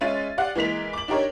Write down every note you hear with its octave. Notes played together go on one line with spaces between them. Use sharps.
G#3 C#4 F4 E5 A6 D#7
G4 D5 F5 F#5
E3 G#3 A#3 B6 F7
D6 F#7
D4 D#4 G4 A#4 C#5